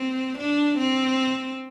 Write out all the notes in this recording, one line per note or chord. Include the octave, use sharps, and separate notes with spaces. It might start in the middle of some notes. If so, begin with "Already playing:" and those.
Already playing: C4
D4
C4